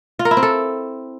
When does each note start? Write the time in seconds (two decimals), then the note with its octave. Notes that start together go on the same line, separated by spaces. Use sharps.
0.19 F4
0.25 A#4
0.31 E4
0.37 C4
0.43 A4